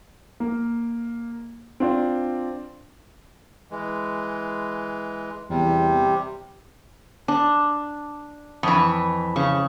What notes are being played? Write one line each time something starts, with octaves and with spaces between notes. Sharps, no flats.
A#3
C4 D4 F4 D5
E3 G#3
E2 C3 G3
D4
F2 E3 C#6
C#3 C#6